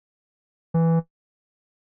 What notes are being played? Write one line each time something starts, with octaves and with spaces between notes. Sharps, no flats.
E3